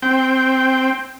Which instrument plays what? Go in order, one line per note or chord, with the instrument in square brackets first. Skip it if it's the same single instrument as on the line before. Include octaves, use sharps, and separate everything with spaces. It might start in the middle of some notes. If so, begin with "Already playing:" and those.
[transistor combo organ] C4 G5